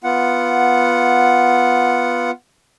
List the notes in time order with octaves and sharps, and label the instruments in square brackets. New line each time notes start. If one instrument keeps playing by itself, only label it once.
[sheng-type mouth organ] B3 F4 F#5